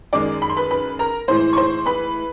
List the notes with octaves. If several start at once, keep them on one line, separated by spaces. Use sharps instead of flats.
F#2 D#3 G#3 D5 D6
B5
C6
B4 B5
B4 B5
A#4 A#5
A2 E3 G#3 C5 C6
C#6
C5 C6
B4 B5